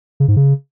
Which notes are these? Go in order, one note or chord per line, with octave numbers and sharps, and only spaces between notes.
C#3
G#2
C#3